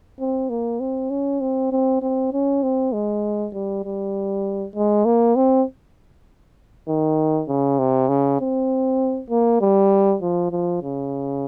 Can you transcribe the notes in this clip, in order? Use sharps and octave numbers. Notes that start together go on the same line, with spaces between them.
C4
A#3
C4
C#4
C4
C4
C4
C#4
C4
G#3
G3
G3
G#3
A#3
C4
D#3
C#3
C3
C#3
C4
A#3
G3
F3
F3
C#3